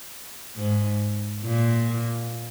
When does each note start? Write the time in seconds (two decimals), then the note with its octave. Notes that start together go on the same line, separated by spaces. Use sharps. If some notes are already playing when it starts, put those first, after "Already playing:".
0.56 G#2
1.43 A#2